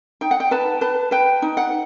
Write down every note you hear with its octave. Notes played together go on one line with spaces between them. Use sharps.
D#4 G5
F#5
G5
B4 A5
B4 A5
B4 G5
D#4
F#5